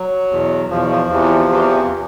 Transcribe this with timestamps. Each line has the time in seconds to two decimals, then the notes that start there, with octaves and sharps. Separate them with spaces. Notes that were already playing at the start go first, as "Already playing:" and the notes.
Already playing: F#3
0.32 E2 B2
0.70 E2 B2 F3
0.90 F3
1.10 E2 C3 E3
1.49 E2 C3 E3